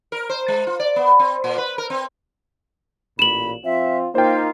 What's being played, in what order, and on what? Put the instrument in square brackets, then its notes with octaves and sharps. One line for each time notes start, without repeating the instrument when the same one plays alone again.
[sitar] A#4
C5
G#3
F4
D5
B3
C4
A#2
B4
A#4
C4
[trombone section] A1 A#2 [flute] B5 [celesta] E7 F#7
[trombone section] F3 C4 F4 [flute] E5
[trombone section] A#3 D#4 [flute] F4 [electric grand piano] C5 G5